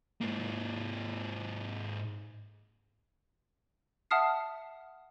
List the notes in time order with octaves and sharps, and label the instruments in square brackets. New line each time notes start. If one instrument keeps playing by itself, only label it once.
[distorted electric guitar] G#2 A#3
[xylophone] E5 F#5 A5 D#6 F6 C7